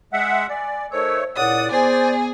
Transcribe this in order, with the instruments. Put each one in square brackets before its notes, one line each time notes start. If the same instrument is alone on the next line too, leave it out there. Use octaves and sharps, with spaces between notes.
[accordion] G#3 E5 F#5
[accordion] D5 [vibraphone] G#5
[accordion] A3 C#5 [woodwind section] D#4 A#4 E6 [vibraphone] C5
[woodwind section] C#2 A#2 F#5 [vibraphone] E4 A#4 C#5 [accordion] D5 [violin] D#6
[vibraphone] B3 [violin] G#4 G#5 [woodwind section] C5